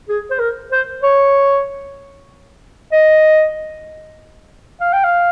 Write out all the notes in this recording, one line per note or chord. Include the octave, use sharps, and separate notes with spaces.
G#4
C5
A#4
C5
C#5
D#5
F5
G5
F5